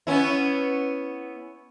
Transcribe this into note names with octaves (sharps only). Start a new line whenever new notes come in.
B3 C#4 E4